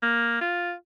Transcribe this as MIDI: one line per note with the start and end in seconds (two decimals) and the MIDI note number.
0.03 0.37 58
0.41 0.73 65